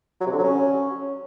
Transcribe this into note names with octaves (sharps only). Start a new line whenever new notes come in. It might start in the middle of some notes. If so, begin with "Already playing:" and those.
F#3
C3
D3
F#3
C#4